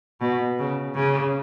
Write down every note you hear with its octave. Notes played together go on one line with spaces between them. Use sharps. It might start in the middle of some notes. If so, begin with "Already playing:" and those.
B2
C#3
C#3